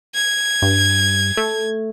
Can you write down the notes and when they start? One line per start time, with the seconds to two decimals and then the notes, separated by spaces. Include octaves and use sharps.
0.15 G#6
0.62 G2
1.37 A3